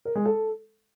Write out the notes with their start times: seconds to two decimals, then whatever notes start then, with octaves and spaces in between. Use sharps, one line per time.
0.05 A#4
0.15 G#3
0.25 A4